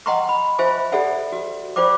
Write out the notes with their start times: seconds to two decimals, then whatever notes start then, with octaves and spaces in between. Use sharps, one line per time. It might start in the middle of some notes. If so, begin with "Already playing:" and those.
0.06 D#5 F#5 G5 A#5 C6 C#6
0.29 B5
0.59 F4 C5 E5 G#5 C#6
0.92 G4 A4 D5 E5 F#5 G#5
1.32 F#4
1.76 F4 C5 D5 G5 D6